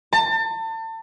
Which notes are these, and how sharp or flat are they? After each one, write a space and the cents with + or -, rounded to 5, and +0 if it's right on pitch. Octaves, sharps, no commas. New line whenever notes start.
A5 +35